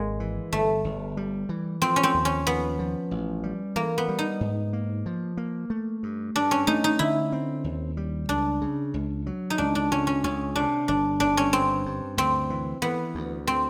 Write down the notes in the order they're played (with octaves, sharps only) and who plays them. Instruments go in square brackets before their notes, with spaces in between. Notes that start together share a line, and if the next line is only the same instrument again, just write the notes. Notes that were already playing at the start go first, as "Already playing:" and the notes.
Already playing: [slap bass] G#1 [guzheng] G#3 A#3
[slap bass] E3
[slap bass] G1 [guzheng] A3
[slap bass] G1
G3
E3
[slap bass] F3 [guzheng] C4
[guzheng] C#4
C4
[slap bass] D#2
[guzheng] C#4
[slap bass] F3 [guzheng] B3
[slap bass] F3
A1
G3
[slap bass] E3 [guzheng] A#3
[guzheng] B3
[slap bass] G3
[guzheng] D#4
[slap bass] G#2
A#3
F3
A#3
A3
G2
[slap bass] G2 [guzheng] D4
[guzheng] C#4
[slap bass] A3 [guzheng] D#4
[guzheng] D#4
[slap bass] D3 [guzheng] E4
[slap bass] C4
D#2
G3
[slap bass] C#2 [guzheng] D4
[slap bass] C#3
C#2
F#3
[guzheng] D#4
[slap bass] C#2 [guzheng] D4
[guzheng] D4
[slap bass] C#2 [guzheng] C#4
[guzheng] C#4
[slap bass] C#2 [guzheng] C#4
[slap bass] C3 [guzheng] D4
[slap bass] G1 [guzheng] D4
[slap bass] G1 [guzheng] D4
[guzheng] C#4
[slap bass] G2 [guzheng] C4
[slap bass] G2
[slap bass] D2 [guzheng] C4
[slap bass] E3
[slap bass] E3 [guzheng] B3
[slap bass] D2
[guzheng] C4